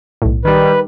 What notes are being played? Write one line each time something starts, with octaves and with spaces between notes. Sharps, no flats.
B1 A2
D#3 G3 B4